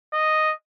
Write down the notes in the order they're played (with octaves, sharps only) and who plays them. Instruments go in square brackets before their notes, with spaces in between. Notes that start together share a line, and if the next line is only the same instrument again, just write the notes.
[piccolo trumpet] D#5